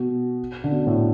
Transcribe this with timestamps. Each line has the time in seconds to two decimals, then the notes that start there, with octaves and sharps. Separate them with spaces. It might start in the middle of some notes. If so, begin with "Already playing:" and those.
Already playing: B2
0.64 D3
0.71 B2
0.87 A2